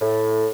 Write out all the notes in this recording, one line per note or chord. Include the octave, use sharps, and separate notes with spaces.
A2